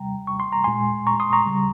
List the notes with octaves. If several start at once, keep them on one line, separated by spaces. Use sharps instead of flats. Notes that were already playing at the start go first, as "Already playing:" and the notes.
Already playing: C3 G3 G5 A#5
C#6
C6
A#5
A#2 G#3 G#5 C6
A#5 C#6
C6 D#6
A#5 C#6
C#3 G3